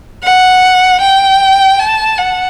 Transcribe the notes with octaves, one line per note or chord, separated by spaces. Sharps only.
F#5
G5
A5
F#5